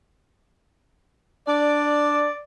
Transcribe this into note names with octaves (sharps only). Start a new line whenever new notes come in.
D4 D5